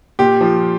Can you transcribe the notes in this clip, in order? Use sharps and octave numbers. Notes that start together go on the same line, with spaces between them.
A#2 G4
F3